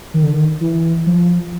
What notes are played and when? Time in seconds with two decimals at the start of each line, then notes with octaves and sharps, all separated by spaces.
0.14 D#3
0.23 D3
0.32 D#3
0.61 E3
1.06 F3